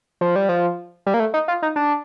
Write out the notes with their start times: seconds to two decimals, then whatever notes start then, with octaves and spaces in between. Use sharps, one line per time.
0.21 F3
0.36 G3
0.49 F3
1.06 G3
1.14 A#3
1.20 A3
1.34 D#4
1.48 F4
1.63 D#4
1.76 D4